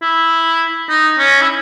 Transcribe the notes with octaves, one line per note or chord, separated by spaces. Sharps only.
E4
D#4
C#4
E4